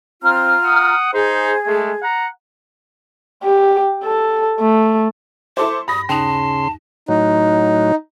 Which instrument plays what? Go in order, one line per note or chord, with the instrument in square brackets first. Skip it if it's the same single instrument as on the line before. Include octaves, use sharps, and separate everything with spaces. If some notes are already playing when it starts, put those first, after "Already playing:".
[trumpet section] C4 [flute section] F4 A#5 F6
[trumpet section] F#5 D#6
[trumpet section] D#4 C5 [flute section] G#4
[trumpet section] G#3 A3
F#5 A#5
[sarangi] G4
A4
A3
[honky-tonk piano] E4 A4 C5 [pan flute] D6
[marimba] G2 [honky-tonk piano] B5 A#6 [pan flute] D#6
[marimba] D#2 D#4 [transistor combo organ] C#3 C6 [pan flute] A5
[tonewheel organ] A2 F#3 [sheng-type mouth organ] D#4